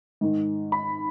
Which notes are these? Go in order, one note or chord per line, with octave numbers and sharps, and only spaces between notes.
G#2 D#3
B5